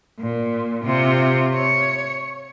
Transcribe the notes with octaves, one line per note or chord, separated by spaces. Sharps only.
A#2
C3 F4
C#5